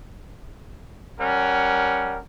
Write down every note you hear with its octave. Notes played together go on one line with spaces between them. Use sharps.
G3 C#4 A#4 F#5